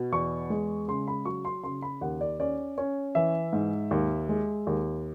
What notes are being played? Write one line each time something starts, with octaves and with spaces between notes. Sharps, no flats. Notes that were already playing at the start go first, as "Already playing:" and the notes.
Already playing: B2
E2 C#6
G#3
C#3 C6
B5
F#3 C#6
C6
C#3 C6
B5
D#2 F#5
D5
C#4 D5
C#4
E3 E5
G#2
D#2
G#3
D#2